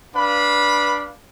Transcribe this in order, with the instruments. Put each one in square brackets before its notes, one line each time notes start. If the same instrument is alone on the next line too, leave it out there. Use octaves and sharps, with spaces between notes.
[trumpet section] D4 B4 F5 B5